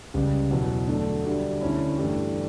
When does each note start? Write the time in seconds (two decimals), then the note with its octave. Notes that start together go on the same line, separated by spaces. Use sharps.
0.14 C#2 C#3 G3
0.51 E2 B2 F#3
0.88 D3 F#3 A3
1.24 D2 D3 G3 D4 F#4
1.61 D2 D3 A3 C#4 E4
1.98 G2 E3 A3 D4 G4